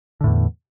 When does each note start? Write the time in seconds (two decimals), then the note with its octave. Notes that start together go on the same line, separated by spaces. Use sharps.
0.21 D3
0.24 A2
0.27 E2